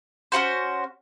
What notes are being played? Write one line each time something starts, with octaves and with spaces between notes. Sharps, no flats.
C#4 E4 F#4 C5